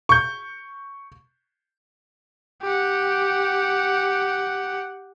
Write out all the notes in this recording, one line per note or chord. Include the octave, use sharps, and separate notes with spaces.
C#6 G6
G4 F#5